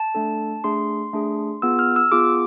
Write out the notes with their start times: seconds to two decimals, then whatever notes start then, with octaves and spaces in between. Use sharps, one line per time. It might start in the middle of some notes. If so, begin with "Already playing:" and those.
Already playing: A5
0.15 A3 D4 A4
0.64 A3 D4 G#4 C6
1.13 A3 D4 G#4
1.62 B3 F4 G#4 E6
1.79 F6
1.96 E6
2.12 B3 F4 G#4 D6